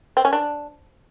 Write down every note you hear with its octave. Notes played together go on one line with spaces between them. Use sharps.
C4
C#4
D4